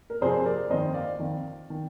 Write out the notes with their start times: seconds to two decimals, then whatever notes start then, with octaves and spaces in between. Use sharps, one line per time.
0.10 A#4
0.21 F2 C3 F3 G#4 C5
0.45 A#4 D5
0.70 F2 D#3 C5 D#5
0.94 D5 F5
1.19 F2 D#3
1.70 D#3